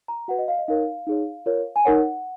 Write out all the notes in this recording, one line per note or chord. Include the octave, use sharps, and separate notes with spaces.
A#5
F#4 B4 F#5
D#5
F5
D#5
D#4 A#4 C#5 F5
D#4 G#4 C#5
F4 A#4 C#5
G#5
D#4 A#4 C#5 F#5